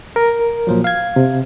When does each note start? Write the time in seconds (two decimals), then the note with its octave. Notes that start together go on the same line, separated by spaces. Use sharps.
0.16 A#4
0.67 A#2 F3 F#3
0.84 F5 G#6
1.16 C3